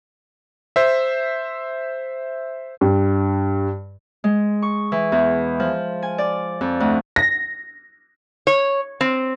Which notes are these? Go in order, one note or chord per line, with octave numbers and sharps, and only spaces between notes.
C5 E5
G2
G#3
C#6
E3
E2
F3
G#5
D5
F2
D2
A#6
C#5
C4